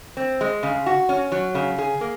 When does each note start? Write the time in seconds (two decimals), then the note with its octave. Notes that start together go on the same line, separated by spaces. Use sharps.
0.17 C4
0.41 G#3
0.63 C#3
0.86 F#4
1.09 C#4
1.32 F#3
1.55 C#3
1.78 G#4
2.01 A#3